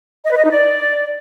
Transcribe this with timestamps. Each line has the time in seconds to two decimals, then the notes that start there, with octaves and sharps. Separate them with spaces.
0.25 D#5
0.31 B4
0.37 D#5
0.44 D#4
0.50 D5